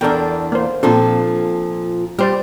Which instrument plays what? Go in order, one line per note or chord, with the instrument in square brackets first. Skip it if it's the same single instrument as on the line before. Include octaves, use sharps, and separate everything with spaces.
[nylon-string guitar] E2 D4 [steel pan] A4 A#4 G5
[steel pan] A#3 C5
[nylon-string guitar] A#2 F3 A4 [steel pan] C4 D4
[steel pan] G3 C5 D5 [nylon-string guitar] G4